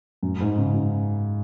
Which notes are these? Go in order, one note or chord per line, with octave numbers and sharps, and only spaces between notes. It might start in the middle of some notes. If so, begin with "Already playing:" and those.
F#2
G#2
C#3
C#3